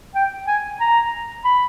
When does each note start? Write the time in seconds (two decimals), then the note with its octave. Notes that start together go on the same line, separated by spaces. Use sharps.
0.15 G5
0.47 G#5
0.80 A#5
1.44 B5